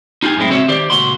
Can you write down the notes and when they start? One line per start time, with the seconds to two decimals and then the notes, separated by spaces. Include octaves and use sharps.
0.23 D#4 F4 G4 F#5 G#5
0.36 F#2 A2 G#3 C4 E4
0.51 C#2 C4 C#4 F#4 C#5 E5
0.68 D#3 G4 C5 D5
0.90 C#2 A#2 F#4 C6